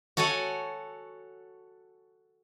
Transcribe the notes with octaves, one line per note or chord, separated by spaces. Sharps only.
F#4 A4 C#5 F#5 G#5